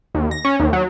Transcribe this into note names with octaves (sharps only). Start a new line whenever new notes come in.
D#2
A#6
C#4
D#2
F#3